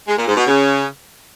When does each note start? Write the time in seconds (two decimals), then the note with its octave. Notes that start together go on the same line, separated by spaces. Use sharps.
0.08 G#3
0.18 A#2
0.27 G#2
0.37 B2
0.47 C#3